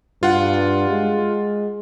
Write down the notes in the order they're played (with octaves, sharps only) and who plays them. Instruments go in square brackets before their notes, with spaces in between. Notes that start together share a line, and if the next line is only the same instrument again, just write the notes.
[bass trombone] G2 [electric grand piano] F4 F#5
[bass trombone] G#3